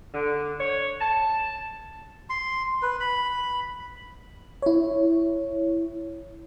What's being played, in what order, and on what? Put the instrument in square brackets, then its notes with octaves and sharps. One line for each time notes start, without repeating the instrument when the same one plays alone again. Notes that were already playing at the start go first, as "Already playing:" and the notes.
[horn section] D3
C#5
A5
[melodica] C6
B4
B5
[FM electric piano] E4 C#5